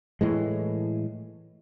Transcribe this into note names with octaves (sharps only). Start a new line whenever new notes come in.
A2 E3 G#3